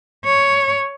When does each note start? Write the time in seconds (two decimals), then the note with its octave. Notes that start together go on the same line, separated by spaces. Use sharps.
0.25 C#5